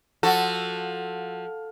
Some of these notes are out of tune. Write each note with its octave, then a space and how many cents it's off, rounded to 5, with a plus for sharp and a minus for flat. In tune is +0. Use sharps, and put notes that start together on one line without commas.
F3 +15 F#4 +5 A4 +0